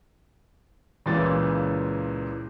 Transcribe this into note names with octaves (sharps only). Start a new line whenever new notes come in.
C#2 A#2 C#3 E3 A6